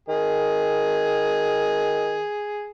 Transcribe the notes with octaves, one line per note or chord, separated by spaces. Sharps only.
D#3 G#4